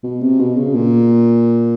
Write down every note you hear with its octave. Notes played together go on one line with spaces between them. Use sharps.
B2
C3
B2
C#3
A#2